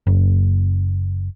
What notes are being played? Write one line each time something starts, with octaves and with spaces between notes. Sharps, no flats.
F#1